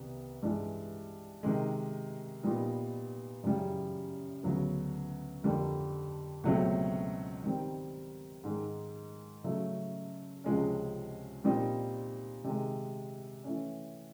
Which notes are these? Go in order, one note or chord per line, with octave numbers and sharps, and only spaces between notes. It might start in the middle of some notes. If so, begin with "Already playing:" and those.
Already playing: C2 C3 D#3 B3
G2 E3 G#3
C3 D#3 G#3
A#2 G3 B3 D#4
F#2 C#3 E3 G3
D2 C#3 F#3 B3
F2 D3 G3 A#3
C#2 B2 F#3 A3 C4
D#3 G3 C4
G#2 D#3 G#3
C#3 F#3 A3
C#2 C3 F3 G#3 C#4
A#2 G3 C4 D#4
C3 D#3 G#3
E3 A3 C#4